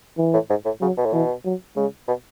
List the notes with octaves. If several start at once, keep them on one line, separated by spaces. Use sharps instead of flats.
E3
A2
G#2
A2
C#3 F#3
B2
A2
B2 E3
F#3
C#3 G#3
B2